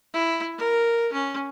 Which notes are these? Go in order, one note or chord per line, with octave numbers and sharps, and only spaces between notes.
E4
A#4
C#4